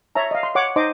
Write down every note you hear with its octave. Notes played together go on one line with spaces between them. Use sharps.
C#5 E5 A5 A#5
D#5 F5
C6
C#5 F#5 D6
D#4 C5 D#5 C6 D6